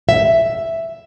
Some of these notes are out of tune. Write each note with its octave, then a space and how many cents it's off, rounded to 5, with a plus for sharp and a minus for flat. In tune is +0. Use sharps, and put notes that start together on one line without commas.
E5 +5